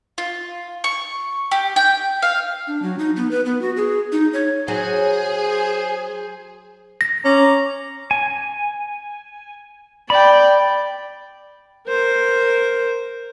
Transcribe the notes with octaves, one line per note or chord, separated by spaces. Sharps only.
F4
C#6
G4
G5
F5
D4
F#3
D#4
B3
B4
B3
F#4
G#4
D#4
C#5
F#3 G#4 C5
A#6
C#4 A#5 D6
G#5
D5 G5 B5
A#4 C5